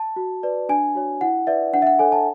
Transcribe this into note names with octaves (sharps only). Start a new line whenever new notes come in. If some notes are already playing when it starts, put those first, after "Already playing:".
Already playing: A5
F#4
B4 D5
D4 G#5
F#4 C#5
E4 F#5
B4 D5 E5
D4 F#5
E5
F#5
A4 C#5 G#5
A5